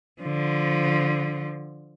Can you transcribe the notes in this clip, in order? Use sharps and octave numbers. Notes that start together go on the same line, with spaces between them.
D3 F3